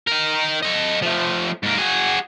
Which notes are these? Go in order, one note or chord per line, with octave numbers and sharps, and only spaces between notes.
D#4 A#4
A4 D#5
F3 A3
G#2 A#3
F#4 G#4